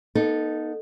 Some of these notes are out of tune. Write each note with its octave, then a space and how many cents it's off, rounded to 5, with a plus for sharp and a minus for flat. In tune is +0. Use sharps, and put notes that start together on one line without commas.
B3 -35 D#4 +0 A4 +0